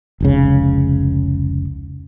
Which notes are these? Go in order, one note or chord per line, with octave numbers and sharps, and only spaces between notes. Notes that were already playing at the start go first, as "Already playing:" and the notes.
F1 C#2 C#3